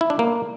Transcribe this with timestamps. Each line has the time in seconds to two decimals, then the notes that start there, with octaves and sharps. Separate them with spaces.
0.01 E4
0.10 D4
0.19 A#3